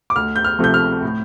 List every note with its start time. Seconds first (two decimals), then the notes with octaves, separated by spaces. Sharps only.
0.10 D6
0.16 D2 F6
0.36 G6
0.44 F6
0.59 C3 F3 A3 G6
0.74 F6
1.02 A2